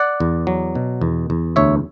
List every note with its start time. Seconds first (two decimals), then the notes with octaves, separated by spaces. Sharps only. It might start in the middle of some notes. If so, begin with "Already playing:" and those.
Already playing: D5 F#5
0.20 E2
0.47 F#3
0.75 B2
1.01 E2
1.30 E2
1.56 D2 C#5 E5